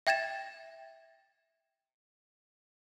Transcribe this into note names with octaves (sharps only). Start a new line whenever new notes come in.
E5 G5 G#6 A6 E7